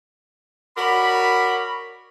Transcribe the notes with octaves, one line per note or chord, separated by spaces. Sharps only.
F#4 A#4 C#5 D5 B5